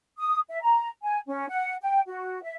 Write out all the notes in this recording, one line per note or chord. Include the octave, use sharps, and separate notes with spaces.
D#6
E5
A#5
G#5
C#4
F#5
G5
F#4
E5